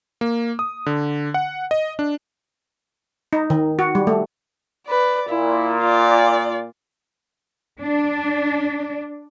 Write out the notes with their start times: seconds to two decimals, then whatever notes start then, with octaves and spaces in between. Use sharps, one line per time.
0.21 A#3
0.59 D#6
0.86 D3
1.34 F#5
1.71 D#5
1.99 D4
3.33 D#4
3.50 D#3
3.79 F#4
3.95 G3
4.07 A3
4.87 B4 D5
5.29 A#2 E4
5.82 F4 D5
7.81 D4